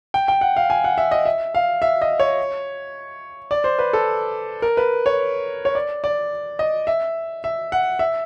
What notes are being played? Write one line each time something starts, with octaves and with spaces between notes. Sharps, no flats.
G5
G5
F#5
F5
G#5
F#5
E5
D#5
E5
F5
E5
D#5
C#5
D5
C5
B4
A4
A#4
B4
C#5
C#5
D5
D5
D#5
E5
E5
F#5
E5